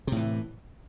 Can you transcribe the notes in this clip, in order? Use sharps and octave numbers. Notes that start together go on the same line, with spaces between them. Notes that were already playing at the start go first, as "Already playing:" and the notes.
A2 C3 E3